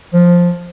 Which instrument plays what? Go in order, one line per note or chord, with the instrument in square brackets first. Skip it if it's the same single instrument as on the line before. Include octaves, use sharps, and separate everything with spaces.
[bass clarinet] F3